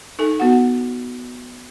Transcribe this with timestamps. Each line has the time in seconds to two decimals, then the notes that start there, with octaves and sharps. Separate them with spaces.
0.19 D#4 A4 G#5
0.40 B3 F#4 F#5